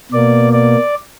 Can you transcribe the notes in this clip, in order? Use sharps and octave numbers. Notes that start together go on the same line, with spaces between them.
B2 A#3 D5
D5